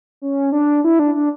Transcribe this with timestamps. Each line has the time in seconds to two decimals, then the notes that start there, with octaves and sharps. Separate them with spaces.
0.22 C#4
0.52 D4
0.84 E4
0.99 D4
1.15 D4